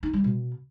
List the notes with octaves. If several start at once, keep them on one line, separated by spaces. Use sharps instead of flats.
D#4
G3
B2